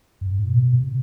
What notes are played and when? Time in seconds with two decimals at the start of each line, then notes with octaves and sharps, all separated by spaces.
0.21 F#2
0.31 G2
0.39 A2
0.48 B2
0.64 B2
0.80 C3